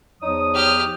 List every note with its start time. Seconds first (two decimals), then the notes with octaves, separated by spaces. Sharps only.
0.22 E2 F3 D#4 C#5 D#6
0.54 G4 F6